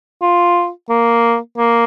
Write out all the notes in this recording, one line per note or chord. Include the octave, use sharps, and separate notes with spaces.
F4
A#3
A#3